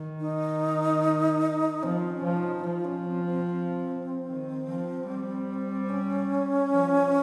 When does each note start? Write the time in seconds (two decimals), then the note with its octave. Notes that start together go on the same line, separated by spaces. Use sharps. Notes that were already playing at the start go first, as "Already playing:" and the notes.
Already playing: D#3
0.20 D#4
1.83 F3 C4
2.10 C#4
2.24 F3
2.37 D#4
2.64 F3 F4
2.85 C#4
3.05 C4
3.25 C4
3.46 C4
4.27 D#3
4.67 F3
5.08 G3
5.89 C#4
6.71 F3